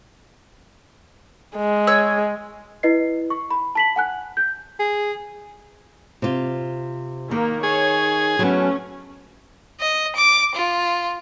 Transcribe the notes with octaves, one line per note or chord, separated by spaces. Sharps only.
G#3
C#5 E6
E4 B4 D#5 C7
C#6
B5
A5 B6 F#7
F#5 G#5 F#6
G6
G#4
C3 F4
D#3 A#3
G#4 C#5
F#3 A3 B3 C#4
D#5
D6
F4